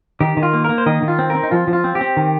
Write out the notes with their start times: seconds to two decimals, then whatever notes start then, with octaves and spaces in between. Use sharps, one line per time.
0.21 D#3 G4
0.37 D#3
0.43 F4
0.53 A#3
0.64 A#3 A#4
0.78 C5
0.86 D#3 D#5
1.02 D#3
1.08 F4
1.19 C4
1.30 C4 A#4
1.43 D#4
1.51 F3 F4
1.68 F3
1.73 F4
1.84 C4
1.95 G4
2.01 C4
2.17 D#3